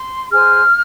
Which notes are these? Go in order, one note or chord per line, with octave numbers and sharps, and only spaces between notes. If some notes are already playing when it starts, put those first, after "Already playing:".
Already playing: C6
G#4 C5 F6